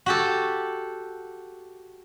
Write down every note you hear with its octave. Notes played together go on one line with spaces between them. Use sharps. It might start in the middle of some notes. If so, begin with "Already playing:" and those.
F#4 G4 A4